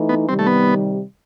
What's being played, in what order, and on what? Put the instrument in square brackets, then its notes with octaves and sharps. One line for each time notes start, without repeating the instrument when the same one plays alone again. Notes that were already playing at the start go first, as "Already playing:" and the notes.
Already playing: [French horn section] E3 A3 D#4
[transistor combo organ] B3
[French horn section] C3 D#3 G3 [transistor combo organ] C4
[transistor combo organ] A3
B3